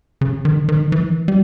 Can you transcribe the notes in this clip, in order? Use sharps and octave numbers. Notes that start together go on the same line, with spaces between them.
C#3
D#3
D#3
E3
G3